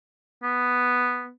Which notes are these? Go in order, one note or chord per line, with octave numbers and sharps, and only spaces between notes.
B3